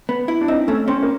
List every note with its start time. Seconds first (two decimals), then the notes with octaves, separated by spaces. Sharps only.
0.09 B3
0.28 E4
0.41 D4
0.48 C4 D#4
0.68 A3 C#4
0.88 C4 C#4
1.03 A#3